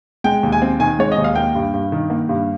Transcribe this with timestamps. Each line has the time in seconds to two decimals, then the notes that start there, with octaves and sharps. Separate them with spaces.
0.24 G#3 G5
0.43 D#2
0.52 G#5
0.62 C4
0.80 D#3 G#5
0.99 G#3 C#5
1.12 D#5
1.17 D#2
1.24 F5
1.35 A#3 G5
1.55 G2
1.73 G2
1.92 D#3
2.10 A#3
2.29 G2